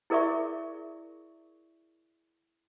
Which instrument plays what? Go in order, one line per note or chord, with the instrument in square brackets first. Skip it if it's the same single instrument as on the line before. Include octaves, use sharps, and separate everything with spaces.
[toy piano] E4 G#4 A#4 D5 E5 C#6